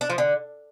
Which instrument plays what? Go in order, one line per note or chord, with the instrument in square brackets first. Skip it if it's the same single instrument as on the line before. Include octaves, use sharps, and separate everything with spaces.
[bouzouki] D4
F3
D3